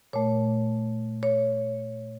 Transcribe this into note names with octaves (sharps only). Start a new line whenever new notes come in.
A#2 A3 C#5
C#5